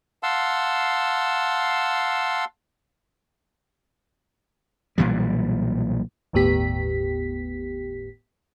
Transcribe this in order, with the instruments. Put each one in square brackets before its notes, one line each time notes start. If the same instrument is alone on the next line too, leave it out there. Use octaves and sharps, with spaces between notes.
[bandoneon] F5 F#5 A5 C6 E6
[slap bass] B1 A#2 E3 G3
[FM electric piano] G1 D#2 A2 B3 G4 B6